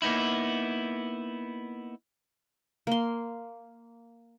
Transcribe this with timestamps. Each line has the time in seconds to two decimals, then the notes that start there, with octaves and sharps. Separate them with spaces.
0.02 A#3 B3 D#4 E4
2.87 A#3 C6